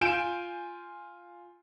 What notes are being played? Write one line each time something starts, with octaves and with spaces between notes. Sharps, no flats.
F4 G#5 G6 D7 E7